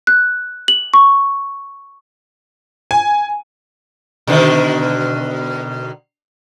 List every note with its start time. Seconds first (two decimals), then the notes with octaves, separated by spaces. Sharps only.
0.07 F#6
0.68 F#7
0.94 C#6
2.91 G#5
4.27 B2 D3 D#3